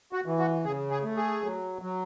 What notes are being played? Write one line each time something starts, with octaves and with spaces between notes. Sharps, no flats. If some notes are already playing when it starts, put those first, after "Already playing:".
F#4
E3
F#4
C#3 G#4
G#4
A3
G#4
F#3
F#3